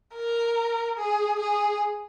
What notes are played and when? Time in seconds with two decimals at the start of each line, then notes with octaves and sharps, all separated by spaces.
0.15 A#4
0.98 G#4
1.40 G#4